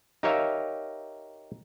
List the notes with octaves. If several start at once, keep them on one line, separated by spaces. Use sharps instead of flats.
D#4 G4 A#4 C#5 E5 F5